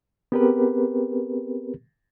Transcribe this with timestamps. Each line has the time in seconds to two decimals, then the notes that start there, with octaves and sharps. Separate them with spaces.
0.32 B3 C4 G4 G#4 A#4 B4